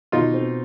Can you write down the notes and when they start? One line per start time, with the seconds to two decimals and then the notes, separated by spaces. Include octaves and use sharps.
0.12 B2 D#4 F4
0.34 C4